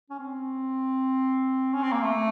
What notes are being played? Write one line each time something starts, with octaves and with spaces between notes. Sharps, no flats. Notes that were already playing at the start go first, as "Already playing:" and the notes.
C#4
C4
C#4
C4
A#3
A3